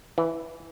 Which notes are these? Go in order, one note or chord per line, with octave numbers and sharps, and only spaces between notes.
E3